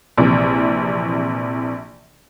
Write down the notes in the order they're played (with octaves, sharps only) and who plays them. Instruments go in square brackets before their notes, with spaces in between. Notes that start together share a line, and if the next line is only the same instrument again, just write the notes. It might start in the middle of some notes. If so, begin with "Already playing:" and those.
[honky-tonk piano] A#1 C3 E3